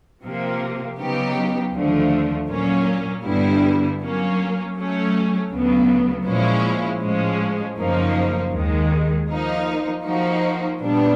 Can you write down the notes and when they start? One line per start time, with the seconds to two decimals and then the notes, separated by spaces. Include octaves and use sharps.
0.22 C3 F3 A#3
0.98 C#3 F#3 B3 D#4 G4
1.74 D#2 D3 F3 A3
2.49 A#2 F#3 A#3 C#4
3.24 G2 D3 G3 B3 E4
4.00 F#3 A#3 C#4
4.75 F#3 A3 C#4
5.51 D2 C#3 F#3 B3
6.26 A#2 F3 G#3 C#4 E4
7.01 A2 F3 G#3 C#4
7.77 F#2 C#3 F3 A#3 D#4
8.52 D#2 D#3 G#3
9.29 F3 A#3 D#4
10.04 F3 A#3 D#4 F#4
10.79 A#2 G3 B3 D4